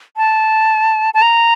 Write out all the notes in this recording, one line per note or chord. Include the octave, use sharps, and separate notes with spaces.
A5
A5
A#5